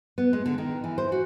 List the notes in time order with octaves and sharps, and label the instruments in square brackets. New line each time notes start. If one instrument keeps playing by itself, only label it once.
[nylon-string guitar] B3
G#3
D3
D#3
E3
C5
F#4